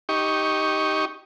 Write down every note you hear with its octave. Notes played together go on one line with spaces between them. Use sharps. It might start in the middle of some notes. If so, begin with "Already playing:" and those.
D#4 G4 C#6